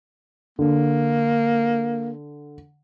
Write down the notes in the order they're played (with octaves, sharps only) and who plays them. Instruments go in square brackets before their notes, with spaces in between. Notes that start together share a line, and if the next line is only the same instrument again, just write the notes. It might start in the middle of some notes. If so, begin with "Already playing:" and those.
[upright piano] D3 [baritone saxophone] A#3